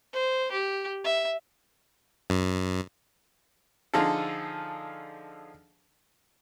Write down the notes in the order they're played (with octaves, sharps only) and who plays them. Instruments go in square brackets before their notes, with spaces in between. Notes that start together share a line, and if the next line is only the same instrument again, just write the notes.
[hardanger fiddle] C5
G4
E5
[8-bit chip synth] F#2
[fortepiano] D3 F3 D#4 F4 G#4 A4